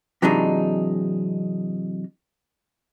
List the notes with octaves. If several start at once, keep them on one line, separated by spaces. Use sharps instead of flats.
C3 E3 F#3 G#3 D4 D#4